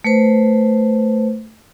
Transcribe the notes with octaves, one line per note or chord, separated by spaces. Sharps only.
A3 B4 C5